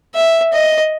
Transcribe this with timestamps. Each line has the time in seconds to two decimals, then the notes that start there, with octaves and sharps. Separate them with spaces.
0.15 E5
0.53 D#5